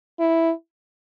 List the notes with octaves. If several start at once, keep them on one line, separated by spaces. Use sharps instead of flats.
E4